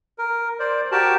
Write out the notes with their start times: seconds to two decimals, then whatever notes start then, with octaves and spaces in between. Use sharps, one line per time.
0.18 A#4
0.60 C5 D5
0.92 F#4 G4 A#4 G5 A5